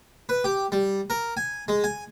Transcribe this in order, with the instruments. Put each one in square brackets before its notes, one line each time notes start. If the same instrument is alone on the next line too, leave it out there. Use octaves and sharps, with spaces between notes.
[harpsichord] B4
G4
G3
A#4
G#5
G#3
G#5